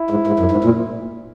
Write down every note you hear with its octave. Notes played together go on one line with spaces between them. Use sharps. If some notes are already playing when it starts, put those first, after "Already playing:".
Already playing: E4
G#2
G#2
F#2
G#2
A#2